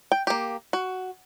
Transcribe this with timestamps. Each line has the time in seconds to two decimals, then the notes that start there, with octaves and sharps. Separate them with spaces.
0.12 G5
0.27 A#3 G4
0.73 F#4